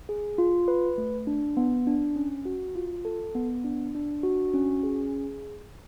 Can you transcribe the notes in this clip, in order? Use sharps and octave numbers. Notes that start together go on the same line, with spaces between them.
G#4
F4
B4
A3
D4
B3
D4
C#4
F#4
F4
A4
B3
D4
D4
F#4
C#4
G#4